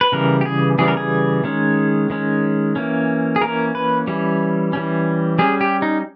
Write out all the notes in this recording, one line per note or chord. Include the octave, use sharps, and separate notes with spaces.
B4
C#3 E3 G3 B3 A#4
G4
G#4
C#3 E3 G3 B3 G#4
A#4
G#4
D#3 G#3 C#4
D#3 G#3 C#4
E3 A#3 C#4
G#4
E3 A#3 C#4 A#4
B4
E3 G3 C#4
E3 G3 C#4
G3 C#4 G#4
G4
D#4